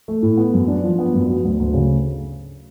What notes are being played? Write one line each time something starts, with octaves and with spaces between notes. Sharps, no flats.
A3
A2
B3
F#2
D4
F3
B3
F#2
F#3
D2
D2
C#3